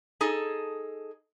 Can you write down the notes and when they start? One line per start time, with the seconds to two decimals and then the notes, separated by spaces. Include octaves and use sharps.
0.21 D#4 G#4 A4